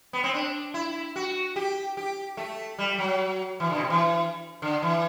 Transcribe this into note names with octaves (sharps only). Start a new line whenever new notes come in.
B3
C4
D4
E4
F#4
G4
G4
A3
G3
F#3
E3
D3
B2
C3
E3
D3
E3